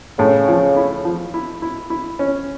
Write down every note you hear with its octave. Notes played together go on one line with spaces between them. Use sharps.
A2 C#3
F3
E4
F3
E4
E4
E4
C#4